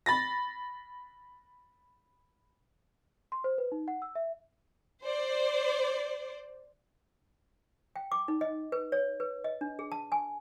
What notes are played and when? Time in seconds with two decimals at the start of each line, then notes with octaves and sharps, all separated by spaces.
0.06 B5 A6 A#6
3.32 C6
3.44 C5
3.58 B4
3.72 D#4
3.88 F#5
4.02 E6
4.15 E5
5.03 C5 D5
7.96 G5
8.12 D6
8.28 D#4
8.41 D#5
8.72 B4
8.92 C#5
9.20 B4
9.44 D#5
9.61 D4
9.79 G#4
9.92 A5
10.12 G#5